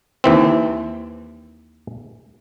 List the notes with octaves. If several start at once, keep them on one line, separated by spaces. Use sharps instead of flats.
D#2 E3 C4